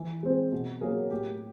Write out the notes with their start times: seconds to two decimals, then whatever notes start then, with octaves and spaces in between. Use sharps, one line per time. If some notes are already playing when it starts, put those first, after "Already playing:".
Already playing: E3
0.23 G#3 C4
0.52 B2
0.81 F#3 A#3 C#4 G#4 A#4
1.10 A2 G4